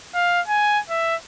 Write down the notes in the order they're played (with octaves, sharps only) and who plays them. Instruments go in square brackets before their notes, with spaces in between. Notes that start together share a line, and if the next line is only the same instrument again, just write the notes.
[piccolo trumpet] F5
G#5
E5